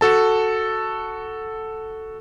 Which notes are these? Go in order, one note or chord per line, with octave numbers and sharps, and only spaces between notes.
F#4 A4 A5